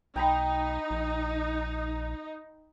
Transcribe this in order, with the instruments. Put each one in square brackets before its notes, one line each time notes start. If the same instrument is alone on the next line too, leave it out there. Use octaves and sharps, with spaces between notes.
[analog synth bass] B1 [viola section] D#4 [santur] G5 A#5 B5
[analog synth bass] A#1